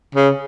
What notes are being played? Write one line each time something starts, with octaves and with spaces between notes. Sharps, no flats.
C#3